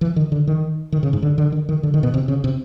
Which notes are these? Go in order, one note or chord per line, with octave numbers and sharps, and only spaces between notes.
E3
D#3
D3
D#3
D#3
C#3
G#2
D3
D3
D#3
D#3
D3
D#3
B2
C3
C#3
C3